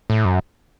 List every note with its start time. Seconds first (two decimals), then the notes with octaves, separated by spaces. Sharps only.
0.10 A2
0.25 F#2